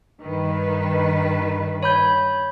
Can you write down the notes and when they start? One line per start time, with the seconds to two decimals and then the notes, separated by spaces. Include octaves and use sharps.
0.21 G2 D#3 B4
1.83 C#5 B5 G6